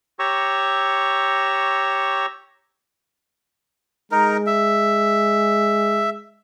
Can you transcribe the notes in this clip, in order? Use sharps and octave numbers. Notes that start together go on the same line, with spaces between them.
G4 C#5 A#5 C#6 E6
G#3 D#4 A#4
E5